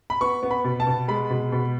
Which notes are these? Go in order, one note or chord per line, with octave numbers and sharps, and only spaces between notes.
B5
B3 C#6
B3
B5
B2
A5
B2
G#3 B5
B2
B2